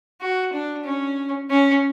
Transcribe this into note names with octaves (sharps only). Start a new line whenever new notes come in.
F#4
D4
C#4
C#4